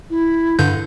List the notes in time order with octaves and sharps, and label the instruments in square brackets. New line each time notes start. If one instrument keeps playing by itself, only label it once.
[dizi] E4
[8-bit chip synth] G2 D3 G6